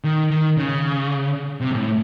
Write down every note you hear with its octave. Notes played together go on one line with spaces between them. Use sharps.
D#3
D#3
C#3
C3
G#2
A2